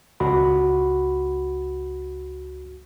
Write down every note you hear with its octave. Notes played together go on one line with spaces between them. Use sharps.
C#2 F#4 F#5 B5